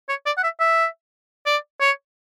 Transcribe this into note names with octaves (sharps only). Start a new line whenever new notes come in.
C#5
D5
F#5
E5
E5
D5
C#5